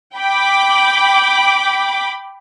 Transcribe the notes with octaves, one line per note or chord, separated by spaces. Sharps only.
G5 B5 D6